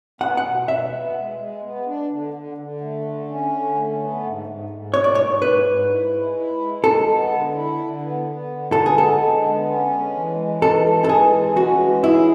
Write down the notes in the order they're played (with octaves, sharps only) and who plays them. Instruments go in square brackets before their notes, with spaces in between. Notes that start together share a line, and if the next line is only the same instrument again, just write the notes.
[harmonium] B3 [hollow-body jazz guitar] F#5
[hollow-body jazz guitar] F#5
[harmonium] B2
[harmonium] B2 [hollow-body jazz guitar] E5
[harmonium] B3
G#3
G#3
B3
D4
D3
D3
D3
A3
D3
C#4
D3
A3
B3
G#2
G#2
G#2
[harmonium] G#2 [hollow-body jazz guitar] C#5
[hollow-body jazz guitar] D5
[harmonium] G#2 [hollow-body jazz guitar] C#5
[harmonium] G#2 [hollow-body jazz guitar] B4
[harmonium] G#2
E4
G#3
E4
G#3
[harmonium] G#3 [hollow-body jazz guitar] A4
[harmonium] B3
D3
E4
D3
B3
B3
D3
[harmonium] B3 [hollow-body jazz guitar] A4
[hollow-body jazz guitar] G#4
[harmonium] G#3 [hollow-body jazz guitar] A4
[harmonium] D3
B3
C#4
G#3
E3
G#3
[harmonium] E3 [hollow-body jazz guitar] A4
[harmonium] G#3
[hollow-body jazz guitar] A4
[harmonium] E3 [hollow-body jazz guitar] G#4
[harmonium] G#3
[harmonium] C#4 [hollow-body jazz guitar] F#4
[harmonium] E3
[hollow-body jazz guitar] E4 [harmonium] G#4